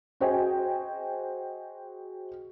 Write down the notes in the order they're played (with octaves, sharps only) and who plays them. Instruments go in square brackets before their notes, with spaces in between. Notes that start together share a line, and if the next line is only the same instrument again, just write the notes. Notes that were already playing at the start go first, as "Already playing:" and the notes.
[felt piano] F#4 G#4 C5 D#5 G5 G#5